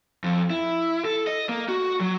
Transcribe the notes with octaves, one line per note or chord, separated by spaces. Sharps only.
F2
E4
A4
D#5
A#3
F#4
F#3